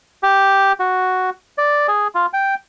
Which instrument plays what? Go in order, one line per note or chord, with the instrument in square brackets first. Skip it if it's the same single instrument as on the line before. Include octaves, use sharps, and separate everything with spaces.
[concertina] G4
F#4
D5
G#4
F4
G5